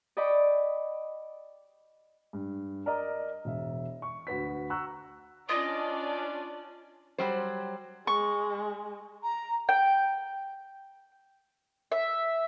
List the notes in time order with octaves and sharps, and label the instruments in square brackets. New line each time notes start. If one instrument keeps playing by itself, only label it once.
[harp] D5 D#5 G5 B5 C#6 D6
[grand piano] G2
A#4 D5 D#5 A#5
E1 E5
C#6
D2 F#4 B4 B6
F#5 A#5 C#6 E6 F#6
[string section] C#4 D4 D5 [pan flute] F4 [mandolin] D#5
[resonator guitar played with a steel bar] F#3 G3 C5
[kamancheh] G#3 [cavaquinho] C#6
[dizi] A#5
[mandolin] G5
E5